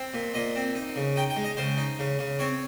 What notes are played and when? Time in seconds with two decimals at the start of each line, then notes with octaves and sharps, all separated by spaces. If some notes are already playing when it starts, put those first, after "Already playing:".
Already playing: C4
0.14 A#2
0.34 A#2 D#5
0.56 C4
0.75 D#4
0.96 C#3
1.16 D#4 G5
1.30 G5
1.37 G#3
1.44 D#5
1.57 C#3 C5
1.78 D#4
1.99 C#3
2.19 C#3
2.39 C4 C#5